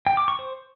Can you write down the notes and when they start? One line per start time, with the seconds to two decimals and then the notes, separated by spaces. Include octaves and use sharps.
0.07 G5
0.17 D6
0.28 C#6
0.39 C5